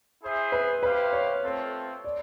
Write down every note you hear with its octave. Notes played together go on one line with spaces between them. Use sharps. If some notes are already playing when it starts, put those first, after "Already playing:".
E4 G#4 C5 E5
B4
E4 G4 B4 C5 F5
C#5
A3 C4 F4 A4
D5